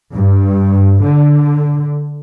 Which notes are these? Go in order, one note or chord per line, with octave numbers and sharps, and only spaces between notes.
G2
D3